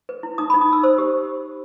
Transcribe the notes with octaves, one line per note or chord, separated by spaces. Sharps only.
B4
E4
D#4 D#6
B5
D#4
D#6
D#4 E6
C5 E6
G4